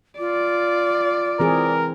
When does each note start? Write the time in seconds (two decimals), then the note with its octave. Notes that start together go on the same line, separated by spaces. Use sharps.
0.19 F4 D5
1.40 E3 C4 G#4 A#4